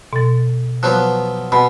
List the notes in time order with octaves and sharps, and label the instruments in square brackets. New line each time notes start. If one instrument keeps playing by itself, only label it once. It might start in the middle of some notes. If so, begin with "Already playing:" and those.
[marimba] B2 A6
[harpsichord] F3 F#3 B3 [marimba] F#6
[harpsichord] B2 [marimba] B5